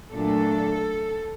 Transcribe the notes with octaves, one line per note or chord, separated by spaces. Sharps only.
A#2 F#3 A3 D4 A4